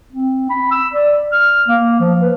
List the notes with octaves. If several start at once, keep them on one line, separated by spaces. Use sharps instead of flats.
C4
B5
E6
D5
F6
A#3
F3
B4